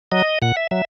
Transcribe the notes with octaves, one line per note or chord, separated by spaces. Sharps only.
F#3 D#5
A#2 F#5
E5
F#3 E5